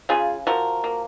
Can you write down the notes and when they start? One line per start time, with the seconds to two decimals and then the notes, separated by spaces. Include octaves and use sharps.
0.09 C#3 F4 G#4
0.47 F3 F#4 A#4
0.84 A#3